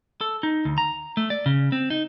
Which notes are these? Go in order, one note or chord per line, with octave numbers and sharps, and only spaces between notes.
A4
D#4
D2
A#5
A3
D5
C#3
C4
D#4